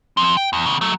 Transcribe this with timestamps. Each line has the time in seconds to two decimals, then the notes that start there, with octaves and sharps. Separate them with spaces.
0.17 F3 C4
0.37 G5
0.53 E2
0.66 E2 C#3
0.81 F#3 A3